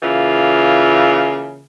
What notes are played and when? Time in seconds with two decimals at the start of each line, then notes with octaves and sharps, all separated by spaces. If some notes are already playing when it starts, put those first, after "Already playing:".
0.03 C#3 E3 A#3 F4